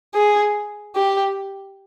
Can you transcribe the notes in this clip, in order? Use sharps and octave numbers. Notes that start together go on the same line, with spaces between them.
G#4
G4